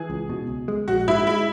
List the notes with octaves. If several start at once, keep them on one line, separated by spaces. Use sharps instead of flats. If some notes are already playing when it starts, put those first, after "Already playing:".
Already playing: E3 G#4
C#2
B2
C#2
G#3
A#1 F#4
G#2 E4
G#3 E4